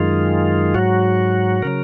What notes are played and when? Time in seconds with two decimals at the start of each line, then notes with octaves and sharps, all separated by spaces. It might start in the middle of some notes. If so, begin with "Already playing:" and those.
Already playing: F#2 D#3 G#3 F4
0.75 G#2 F#3 F#4
1.62 C#3 F#3 A#4